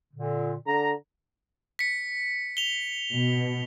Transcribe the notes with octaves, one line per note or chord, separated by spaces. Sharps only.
A#2 D3
D3 A#5
B6 C#7
F7 G7
B2